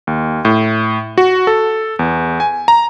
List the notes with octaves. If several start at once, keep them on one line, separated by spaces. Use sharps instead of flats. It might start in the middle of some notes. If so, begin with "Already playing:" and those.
D#2
A2
F#4
A4
E2
G#5
A#5